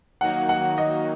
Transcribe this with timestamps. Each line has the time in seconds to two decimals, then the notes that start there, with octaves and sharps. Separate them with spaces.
0.21 D#3 F#3 A#3 D#4 F#4 F#5
0.49 F#5
0.78 D#5